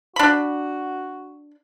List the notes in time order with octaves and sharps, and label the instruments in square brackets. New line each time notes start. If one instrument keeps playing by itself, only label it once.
[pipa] D4 B5 [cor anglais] F#4